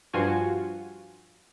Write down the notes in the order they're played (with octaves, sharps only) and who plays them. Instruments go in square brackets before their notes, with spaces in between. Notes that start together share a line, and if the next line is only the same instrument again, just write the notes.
[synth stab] G2 F3 F4 F#4 G#5 C#6